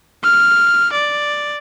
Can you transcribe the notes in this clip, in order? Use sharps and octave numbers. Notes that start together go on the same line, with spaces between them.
F6
D5